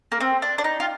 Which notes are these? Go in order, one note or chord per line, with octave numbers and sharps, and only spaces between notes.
A#3
C4
D4
D4
D#4
F4